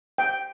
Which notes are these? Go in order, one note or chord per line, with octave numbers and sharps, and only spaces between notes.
G5